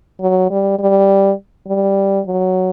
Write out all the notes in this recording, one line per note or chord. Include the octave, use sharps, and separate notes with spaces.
F#3
G3
G3
G3
F#3